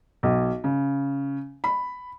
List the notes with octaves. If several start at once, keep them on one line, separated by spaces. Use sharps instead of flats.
B1
C#3
B5